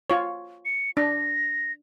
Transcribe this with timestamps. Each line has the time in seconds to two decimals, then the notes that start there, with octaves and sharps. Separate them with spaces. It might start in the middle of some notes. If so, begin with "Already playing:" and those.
0.10 F4 C#5
0.65 C#7
0.97 D4 A#6